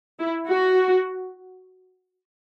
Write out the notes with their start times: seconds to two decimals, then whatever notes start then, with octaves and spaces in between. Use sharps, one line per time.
0.20 E4
0.49 F#4